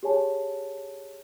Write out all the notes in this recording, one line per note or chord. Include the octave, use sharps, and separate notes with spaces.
G4 G#4 C#5 G#5 A5